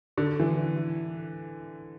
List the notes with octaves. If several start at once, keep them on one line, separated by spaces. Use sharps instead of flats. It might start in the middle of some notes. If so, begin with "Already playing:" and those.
D3
E3